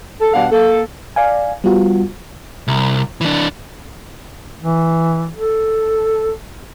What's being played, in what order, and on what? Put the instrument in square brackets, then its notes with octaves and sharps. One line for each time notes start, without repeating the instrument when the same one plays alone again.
[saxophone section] A4
B2 G3 D4 F5 F#5
A#3 A4
[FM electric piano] D5 F5 G#5
G3 B3 F4 F#4
[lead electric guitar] C2
E3 D4
[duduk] E3
A4